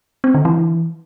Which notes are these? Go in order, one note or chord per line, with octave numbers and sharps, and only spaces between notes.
C4
D3
E3